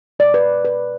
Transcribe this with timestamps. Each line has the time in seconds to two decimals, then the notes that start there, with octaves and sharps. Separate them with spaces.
0.19 B2 G#3 D5
0.34 B4
0.65 B4